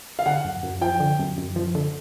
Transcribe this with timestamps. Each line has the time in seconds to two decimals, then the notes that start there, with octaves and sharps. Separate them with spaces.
0.19 F5
0.26 D3 F#5
0.45 F#2
0.63 F#2
0.81 F3 G5
1.00 D3
1.19 F#2
1.38 F#2
1.56 F3
1.75 D3